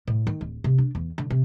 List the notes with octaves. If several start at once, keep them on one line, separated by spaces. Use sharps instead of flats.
A2
D#3
D1
C3
D4
E2
D3
C3